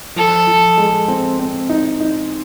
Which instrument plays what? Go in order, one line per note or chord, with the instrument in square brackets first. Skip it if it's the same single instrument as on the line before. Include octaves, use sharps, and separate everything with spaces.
[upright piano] F3 [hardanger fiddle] A4
[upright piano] F3
G#3
C4
C4
D#4
D#4